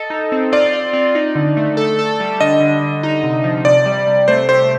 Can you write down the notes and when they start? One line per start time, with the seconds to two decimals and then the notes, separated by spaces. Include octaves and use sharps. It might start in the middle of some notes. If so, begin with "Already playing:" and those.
Already playing: A4 D#5
0.10 D#4
0.32 C4
0.52 F4 D5
0.73 F4
0.93 C4
1.15 D#4
1.35 D3
1.57 A3
1.77 A4
1.99 A4
2.20 G3
2.40 D3 D#5
2.60 D3
2.82 D3
3.03 D#4
3.24 C3
3.44 F3
3.65 C3 D5
3.86 G3
4.07 C3
4.28 A3 C5
4.49 G4 C5